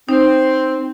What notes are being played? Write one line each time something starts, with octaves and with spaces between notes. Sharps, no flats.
C4 D#4